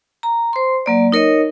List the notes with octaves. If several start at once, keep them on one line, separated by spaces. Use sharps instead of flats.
A#5
C5 C6
F#3 A#3 D5
D#4 A#4 C#5 D#5